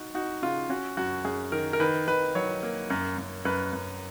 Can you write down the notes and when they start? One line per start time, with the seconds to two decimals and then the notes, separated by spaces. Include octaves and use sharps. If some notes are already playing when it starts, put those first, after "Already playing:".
Already playing: D#4 F#4
0.14 D#4 F#4
0.43 C#3 F4
0.70 C#4 F#4
0.97 F#2 F#4
1.25 F#2 G#4
1.52 D#3 A#4
1.73 A#4
1.80 D#3 B4
2.07 D#3 B4
2.35 F#3 C#5
2.63 A#3
2.90 F#2
3.18 F#2
3.45 F#2 B4
3.73 F#2